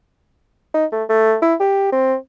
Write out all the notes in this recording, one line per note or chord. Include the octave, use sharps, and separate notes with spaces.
D#4
A3
A3
E4
G4
C4